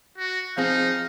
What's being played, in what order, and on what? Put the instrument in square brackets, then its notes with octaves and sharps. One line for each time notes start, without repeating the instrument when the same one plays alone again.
[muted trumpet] F#4
[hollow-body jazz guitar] F3 C4 G#4 [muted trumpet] D#4 [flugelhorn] F5